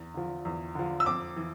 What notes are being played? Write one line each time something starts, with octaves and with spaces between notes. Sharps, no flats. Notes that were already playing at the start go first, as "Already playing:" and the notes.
Already playing: E2
D3 F3
E2
D3 F3
E6
F2 D6
E3